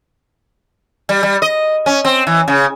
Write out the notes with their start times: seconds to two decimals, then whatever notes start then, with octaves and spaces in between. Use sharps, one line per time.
1.09 G3
1.23 G3
1.42 D#5
1.86 C#4
2.05 C4
2.27 E3
2.48 C#3